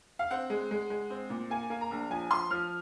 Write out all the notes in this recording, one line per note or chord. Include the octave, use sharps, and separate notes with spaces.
F5
C4 F#5
G#3
G#3
G#3
C4
A#2
A#3 G#5
A#3
A#5
A#1
F3 G#5
F3 C6
F3 F6